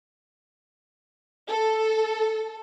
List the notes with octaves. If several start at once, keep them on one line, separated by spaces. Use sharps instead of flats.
A4